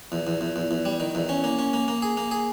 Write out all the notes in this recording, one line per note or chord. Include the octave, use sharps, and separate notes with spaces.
E2
E2
E2
E2
E2
G3
D#3
E2
C#4
A#3
C#4
A#3
A#3
G#4
A#3
G#4